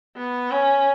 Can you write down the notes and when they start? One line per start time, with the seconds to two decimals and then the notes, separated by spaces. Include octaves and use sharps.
0.16 B3
0.51 C#4